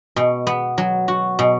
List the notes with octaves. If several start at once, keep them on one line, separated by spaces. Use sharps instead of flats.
B2
B3
F#3
F#4
B2